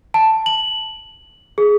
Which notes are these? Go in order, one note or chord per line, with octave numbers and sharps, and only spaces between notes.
A5
F#7
G#4